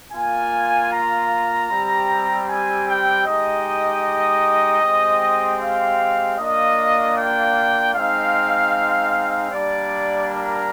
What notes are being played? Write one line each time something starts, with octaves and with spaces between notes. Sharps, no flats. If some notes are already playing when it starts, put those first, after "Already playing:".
A#3 F4 G#5
A#5
G3 C4 G4
G#5
G5
G#3 D#4 G4 D#5
G#3 C4 G4
F5
A#3 D4 F4 D#5
G5
G#3 C4 D#4 F5
G3 A#3 D4 D5
A#4